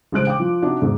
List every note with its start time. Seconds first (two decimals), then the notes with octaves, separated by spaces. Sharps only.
0.12 A1 C#3 G#3 C5 F#6 D7
0.27 G5 D6
0.40 F3
0.62 C3 D4 D#4 F#4
0.82 E2 G#2 D#3